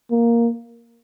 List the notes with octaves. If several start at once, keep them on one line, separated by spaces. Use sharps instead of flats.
A#3